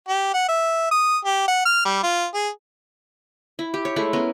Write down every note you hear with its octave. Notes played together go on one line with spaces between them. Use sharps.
G4
F#5
E5
D#6
G4
F#5
F6
G3
F4
G#4
E4
G4
C#5
G#3 A3 E4
B3 C#4 A#4